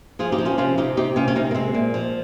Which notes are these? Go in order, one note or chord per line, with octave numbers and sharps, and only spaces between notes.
F3 F4 G#4
D#4 G4
F3
C#4 F4
C3 C#4 F4
C3 D#4 G4
C3 D#4 G4
C3 C#4 F4
C#4
C3 C4 D#4
A#3
C3 G#3 C4
A#2
F3